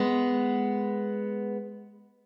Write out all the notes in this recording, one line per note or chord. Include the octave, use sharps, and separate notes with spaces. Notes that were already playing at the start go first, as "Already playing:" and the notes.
Already playing: G#3 B3